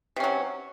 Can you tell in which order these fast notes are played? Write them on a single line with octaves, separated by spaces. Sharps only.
C3 C#4 F#3